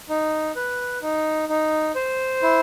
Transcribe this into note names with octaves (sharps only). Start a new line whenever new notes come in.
D#4
B4
D#4
D#4
C5
E4